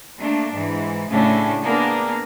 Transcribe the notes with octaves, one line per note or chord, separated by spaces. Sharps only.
A3 A#3 D4
G#2 E3
A2 C#3 A3 C#4 D4
A#3 B3 D4 G#4 A#4